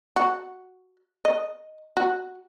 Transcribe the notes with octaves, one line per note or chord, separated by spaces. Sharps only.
F#4
D#5
F#4